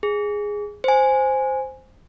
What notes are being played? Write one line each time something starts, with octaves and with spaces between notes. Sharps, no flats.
G#4
C5 G#5